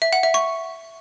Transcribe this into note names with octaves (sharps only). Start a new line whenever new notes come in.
E5
F#5
E5
C#6